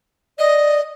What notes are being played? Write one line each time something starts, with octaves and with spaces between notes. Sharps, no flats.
D5 D#5